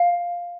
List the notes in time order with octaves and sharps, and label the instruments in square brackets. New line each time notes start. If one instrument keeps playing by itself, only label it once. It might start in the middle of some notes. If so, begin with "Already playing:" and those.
Already playing: [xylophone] F5